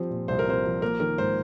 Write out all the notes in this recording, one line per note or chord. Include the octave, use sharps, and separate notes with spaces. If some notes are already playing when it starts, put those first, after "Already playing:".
Already playing: F3 G3 C4
A#2
C2 C5
A#4
C4 C5
F3
A#3 A#4
D#3 A#4
G#2 C5